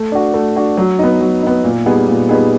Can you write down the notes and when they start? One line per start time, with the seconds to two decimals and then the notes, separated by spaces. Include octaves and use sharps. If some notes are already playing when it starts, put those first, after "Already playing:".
Already playing: A3
0.12 D4 F#4
0.34 A3
0.56 D4 F#4
0.77 F#3
0.99 B3 D#4
1.21 F#3
1.43 B3 D#4
1.64 A#2
1.86 G3 B3 D#4 G#4
2.08 A#2
2.29 G3 B3 D#4 G#4